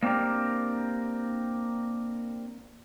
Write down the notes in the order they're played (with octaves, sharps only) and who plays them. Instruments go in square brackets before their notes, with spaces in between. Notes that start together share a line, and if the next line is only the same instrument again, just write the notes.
[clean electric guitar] A#3 C4 D4 G4 A#4